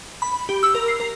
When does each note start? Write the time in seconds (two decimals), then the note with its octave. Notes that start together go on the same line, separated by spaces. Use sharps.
0.22 B5
0.49 G4
0.63 E6
0.75 A#4
0.88 C7
1.00 A#4